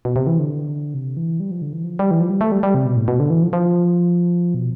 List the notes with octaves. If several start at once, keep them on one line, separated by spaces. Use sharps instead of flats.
B2
C3
E3
D3
C3
E3
G3
F3
D3
E3
F3
G3
E3
F3
G3
A3
G3
G3
C3
B2
A2
B2
D3
E3
F3
F3
B2